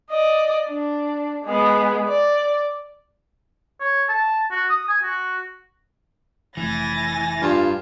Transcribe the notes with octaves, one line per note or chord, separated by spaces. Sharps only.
D5 D#5
D4
G#3 B3
D5
C#5
A5
F#4
D#6
G#5
F#4
F1 E3 G#5 A6 A#6
G2 F4